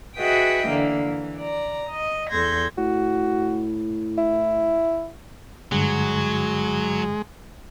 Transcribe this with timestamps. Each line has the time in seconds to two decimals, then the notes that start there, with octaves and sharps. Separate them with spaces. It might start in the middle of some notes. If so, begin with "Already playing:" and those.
0.17 F#4 G#4 B4 D#5 E5 G5
0.67 D3 E3 A#3
1.07 E3
1.38 D5 A#5
1.90 D#5
2.29 E2 A4 C6 G6 G#6 A#6
2.78 A2 F#4
4.18 E4
5.72 G2 D3 F#3 G#3